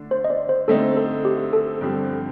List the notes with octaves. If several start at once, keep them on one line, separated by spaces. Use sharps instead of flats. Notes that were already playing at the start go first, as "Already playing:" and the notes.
Already playing: D3 A3 D4
C5
D#5
D5
C5
D3 A3 C4 D#4 A4
A4
G4
A4
G2 D3 F3 C4 G4